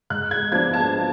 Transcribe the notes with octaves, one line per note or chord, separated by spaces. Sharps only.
G#2 F#6
G#6
F3 B3 D4 G#6
A5